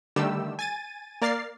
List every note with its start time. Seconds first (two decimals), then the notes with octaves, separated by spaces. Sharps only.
0.16 D3 D#3 G3 A3 G4 E6
0.59 G#5 A6 D#7
1.22 A#3 A#4 D5 F6 A6 C7